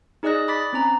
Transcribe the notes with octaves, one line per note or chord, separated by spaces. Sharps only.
D#4 G#4 D5 D#5 F#6 A#6
B5 D6 A6 B6
C4 C#4 A#5